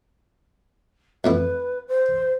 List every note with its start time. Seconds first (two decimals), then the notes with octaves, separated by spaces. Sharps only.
1.24 F2 A2 E4 B4
1.88 C5